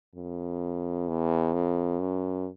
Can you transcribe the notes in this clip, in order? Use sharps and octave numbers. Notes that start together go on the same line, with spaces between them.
F2
E2
F2
F#2